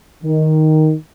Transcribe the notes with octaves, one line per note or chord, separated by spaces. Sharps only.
D#3